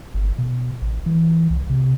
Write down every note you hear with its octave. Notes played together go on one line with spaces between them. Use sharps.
G1
B2
A1
E3
C2
C3